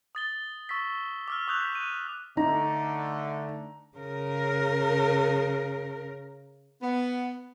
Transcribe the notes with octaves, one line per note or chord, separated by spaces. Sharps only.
D#6 A6 G7
C#6 E6 A6 B6
D6 E6 F6
C#6 D#6 E6 F#6 G6 F7
B6
D#7
D3 A3 D#4 A#5
C#3 A#4
B3